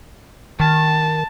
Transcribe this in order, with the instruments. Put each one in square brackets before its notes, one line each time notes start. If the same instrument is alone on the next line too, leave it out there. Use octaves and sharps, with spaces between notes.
[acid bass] D#3 [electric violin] A5